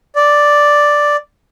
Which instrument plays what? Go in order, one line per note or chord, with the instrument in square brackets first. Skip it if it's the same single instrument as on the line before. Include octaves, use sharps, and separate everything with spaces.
[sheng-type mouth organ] D5